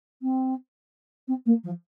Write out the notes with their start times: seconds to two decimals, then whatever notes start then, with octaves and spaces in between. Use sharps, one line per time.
0.22 C4
1.28 C4
1.46 A#3
1.64 F3